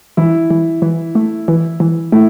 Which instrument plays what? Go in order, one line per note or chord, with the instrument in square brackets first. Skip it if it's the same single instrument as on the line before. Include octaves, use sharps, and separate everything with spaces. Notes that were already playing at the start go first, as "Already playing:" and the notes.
[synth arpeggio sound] E3 [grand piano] E4
[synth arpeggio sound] E3
E3
A3
E3
E3
[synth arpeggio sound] A3 [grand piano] E4